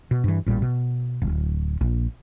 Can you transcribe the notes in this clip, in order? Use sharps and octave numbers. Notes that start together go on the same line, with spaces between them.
B2
G2 E3
A1 A#2 G3
B2
D1
A#1